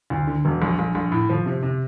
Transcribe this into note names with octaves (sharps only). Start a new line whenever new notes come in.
D2
D3
E1
A#1
A#1
A#1
A2
F3
C3
C3